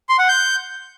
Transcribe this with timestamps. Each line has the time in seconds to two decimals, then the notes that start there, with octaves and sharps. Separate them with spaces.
0.09 C6
0.19 F#5
0.28 G6